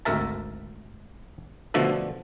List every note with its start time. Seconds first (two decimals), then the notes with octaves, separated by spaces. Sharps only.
0.05 G#1 D2 A4 A#4 E5 A5
1.74 B2 D3 F3 A3 D4 A4